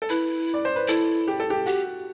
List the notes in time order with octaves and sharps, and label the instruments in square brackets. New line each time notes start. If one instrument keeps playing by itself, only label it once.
[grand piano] A4
[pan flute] E4 [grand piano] B4
[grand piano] D5
C5
B4
[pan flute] E4 [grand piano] A4
[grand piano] G4
A4
G4
[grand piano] F#4 [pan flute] G4